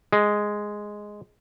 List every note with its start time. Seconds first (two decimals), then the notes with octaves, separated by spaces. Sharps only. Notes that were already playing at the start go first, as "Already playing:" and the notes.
0.13 G#3